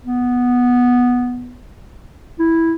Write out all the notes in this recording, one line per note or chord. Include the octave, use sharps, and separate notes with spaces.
B3
E4